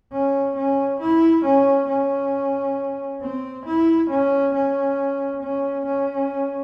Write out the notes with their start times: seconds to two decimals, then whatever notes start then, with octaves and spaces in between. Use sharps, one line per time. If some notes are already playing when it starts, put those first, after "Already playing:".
0.13 C#4
0.57 C#4
1.00 E4
1.46 C#4
1.89 C#4
3.21 C4
3.66 E4
4.10 C#4
4.55 C#4
5.43 C#4
5.86 C#4